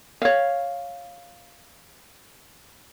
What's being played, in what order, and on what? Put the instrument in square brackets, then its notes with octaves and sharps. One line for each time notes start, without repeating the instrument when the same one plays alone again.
[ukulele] C#5 F5